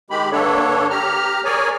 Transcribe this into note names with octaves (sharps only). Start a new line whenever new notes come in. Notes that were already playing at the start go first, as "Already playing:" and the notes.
D#3 G#3 G4 B5
G2 D3 A#3 D4 A4 C#5
G4 A#5 F6
G#4 A#4 C#5 D5 G#5